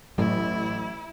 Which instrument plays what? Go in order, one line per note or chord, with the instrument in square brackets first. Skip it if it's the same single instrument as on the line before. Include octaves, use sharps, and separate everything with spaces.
[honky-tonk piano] A1 [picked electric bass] F#3 A3 [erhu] E4